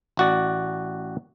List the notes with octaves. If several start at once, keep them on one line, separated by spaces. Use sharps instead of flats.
A1 F#4 D5